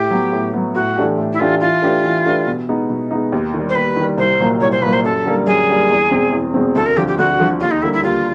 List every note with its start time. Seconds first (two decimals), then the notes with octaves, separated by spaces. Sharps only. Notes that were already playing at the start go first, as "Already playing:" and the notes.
Already playing: A2 G4
0.10 F#3 B3
0.33 A2
0.54 F#3 B3
0.75 A2 F#4
0.96 E3 A3 D4 G4
1.18 A2
1.33 E4
1.40 E3 A3 D4 F4 G4
1.60 E3 F4
1.82 A3 D4 G4 B4
2.04 E3
2.26 A3 D4 G4 B4
2.47 B2
2.68 G#3 B3 D#4
2.89 B2
3.11 G#3 B3 D#4
3.32 D#2
3.54 D#3 G3
3.69 C5
3.75 D#2 B4
3.96 D#3 G3
4.17 C2 C5
4.40 A#2 F#3 A#3
4.61 C2 C#5
4.72 C5
4.82 A#2 B4
4.85 F#3 A#3
4.93 C5
5.04 F#2 A4
5.25 D3 G3 A#3
5.47 F#2 G#4
5.68 D3 G3 A#3
5.89 E2
6.11 B2 G#3 C4
6.32 E2
6.54 B2 G#3 C4
6.75 D2 A4
6.86 A#4
6.96 D3 F3 G4
7.08 G4
7.18 D2 F#4
7.39 D3 F3
7.61 D#2 F4
7.71 D#4
7.82 D3 G3 A#3 E4
7.93 E4
8.04 D#2 F4